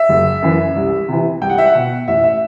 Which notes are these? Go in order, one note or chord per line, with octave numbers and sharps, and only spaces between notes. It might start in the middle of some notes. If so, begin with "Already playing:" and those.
Already playing: E5
F#1
F#2 E3
C2
C3 E3
C2 G5
F#5
E5
F#5
B2
A1 E5
E5